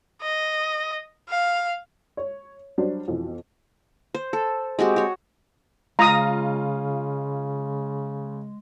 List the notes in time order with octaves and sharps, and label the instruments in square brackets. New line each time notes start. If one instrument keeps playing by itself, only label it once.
[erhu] D#5
F5
[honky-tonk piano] C#5
F#3 G3 D4 F#4 C5
F2 B2 E3
[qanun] C5
A4
G#3 C4 F#4 G4
F#4 C#5
[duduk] C#3 [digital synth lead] G#3 [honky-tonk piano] F4 [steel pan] A#5 D#6